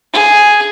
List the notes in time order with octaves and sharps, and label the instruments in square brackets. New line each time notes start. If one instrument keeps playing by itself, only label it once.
[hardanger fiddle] G#4